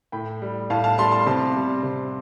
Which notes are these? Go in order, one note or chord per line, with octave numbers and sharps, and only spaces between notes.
A2 G5 B5
G3
A2 F5 A5
F5 A5
G3 A5 C6
A5 C6
C3 A5 C6
G3
C3